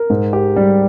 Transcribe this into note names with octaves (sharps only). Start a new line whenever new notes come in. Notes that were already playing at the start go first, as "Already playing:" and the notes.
Already playing: A#4
G#2
G4
G3